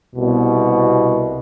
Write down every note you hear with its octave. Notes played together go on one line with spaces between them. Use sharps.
C2 B2